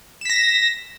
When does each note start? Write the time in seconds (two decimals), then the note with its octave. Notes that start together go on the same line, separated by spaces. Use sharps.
0.21 E7
0.25 B6
0.29 A#6